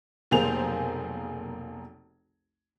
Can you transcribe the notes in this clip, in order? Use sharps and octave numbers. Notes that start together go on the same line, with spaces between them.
F1 B1 A#3 G#4 C5 F7